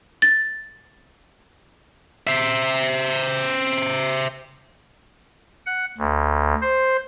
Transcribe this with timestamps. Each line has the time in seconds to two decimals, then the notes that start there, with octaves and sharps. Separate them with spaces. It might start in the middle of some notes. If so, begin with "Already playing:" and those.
0.22 A6
2.27 C5 E5
5.66 F#5
5.98 D2
6.61 C5